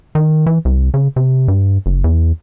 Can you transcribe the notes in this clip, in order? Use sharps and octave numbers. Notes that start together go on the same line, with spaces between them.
D#3
E3
C2
C#3
C3
G2
F#1
E2